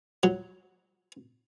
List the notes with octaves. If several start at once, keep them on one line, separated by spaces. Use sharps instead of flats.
F#3